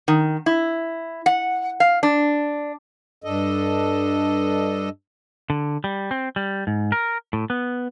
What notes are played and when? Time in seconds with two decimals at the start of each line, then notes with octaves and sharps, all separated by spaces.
0.08 D#3
0.46 E4
1.26 F#5
1.80 F5
2.03 D4
3.24 G2 D4 A4 D#5
5.50 D3
5.84 G3
6.11 C4
6.36 G3
6.67 G#2
6.92 A#4
7.33 A2
7.50 B3